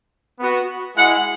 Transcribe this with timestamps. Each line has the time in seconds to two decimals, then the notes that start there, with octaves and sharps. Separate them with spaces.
0.40 B3 F#4
0.96 G#3 E4 F#5